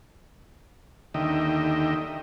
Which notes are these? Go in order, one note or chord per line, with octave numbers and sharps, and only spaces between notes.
D#2 D3 D#3 D#5 E5 G5